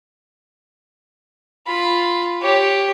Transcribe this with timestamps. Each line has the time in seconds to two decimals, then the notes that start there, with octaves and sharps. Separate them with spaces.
1.67 F4 B5
2.42 G4 C#5